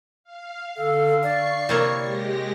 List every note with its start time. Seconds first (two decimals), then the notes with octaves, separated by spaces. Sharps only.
0.24 F5
0.76 D3 A4 F5
1.23 D5 C#6 C7 C#7
1.69 C3 A#3 E4 C#5
2.00 G#3 G4 A#6